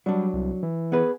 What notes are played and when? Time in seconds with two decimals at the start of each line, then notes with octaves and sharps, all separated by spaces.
0.06 F#3 G3 D4
0.34 C2
0.63 E3
0.92 B3 G#4 B4